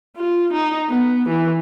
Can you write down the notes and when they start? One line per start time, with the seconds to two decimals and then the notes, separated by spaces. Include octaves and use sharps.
0.17 F4
0.53 D#4
0.90 B3
1.29 E3